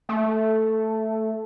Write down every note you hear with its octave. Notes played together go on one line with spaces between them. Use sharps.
A3